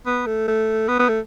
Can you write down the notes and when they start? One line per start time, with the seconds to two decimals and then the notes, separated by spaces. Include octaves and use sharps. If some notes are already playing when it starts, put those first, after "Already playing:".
0.06 B3
0.27 A3
0.48 A3
0.88 B3
0.99 B3
1.09 A3